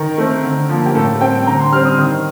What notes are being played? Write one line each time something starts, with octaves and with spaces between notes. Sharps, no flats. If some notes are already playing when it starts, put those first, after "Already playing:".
Already playing: D#3 A#4
A3 C4
D3
F3 A#3
G4
A2 A4
G3 C4 G5
D3 A#5
C6
G3 C4 F6
D#6
D#3